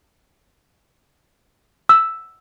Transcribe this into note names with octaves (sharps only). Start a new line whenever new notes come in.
E6